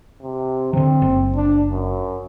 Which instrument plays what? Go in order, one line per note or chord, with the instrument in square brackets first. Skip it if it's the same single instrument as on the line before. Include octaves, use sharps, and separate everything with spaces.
[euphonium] C3
[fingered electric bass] D3 E3 [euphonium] C4
[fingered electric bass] F#1
[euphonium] D4
F#2